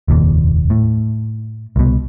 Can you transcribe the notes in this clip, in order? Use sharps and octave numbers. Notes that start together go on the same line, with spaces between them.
F1 D#2 A#2
A2
C2 B2